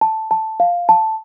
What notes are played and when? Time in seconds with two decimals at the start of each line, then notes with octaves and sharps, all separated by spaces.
0.01 A5
0.31 A5
0.60 F5
0.89 A5